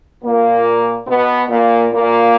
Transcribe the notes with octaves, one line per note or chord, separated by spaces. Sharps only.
A#2 A#3
B2 B3
A#2 A#3
A#2 A#3